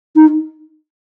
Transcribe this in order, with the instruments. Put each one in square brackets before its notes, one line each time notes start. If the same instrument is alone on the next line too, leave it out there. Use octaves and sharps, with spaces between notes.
[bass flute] D#4